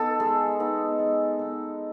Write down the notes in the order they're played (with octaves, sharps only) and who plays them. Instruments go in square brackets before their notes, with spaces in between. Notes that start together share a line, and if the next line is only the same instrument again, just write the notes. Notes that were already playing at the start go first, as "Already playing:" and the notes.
Already playing: [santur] B3 D#4 A4
G#3
B3 D#4
G#3
B3 D#4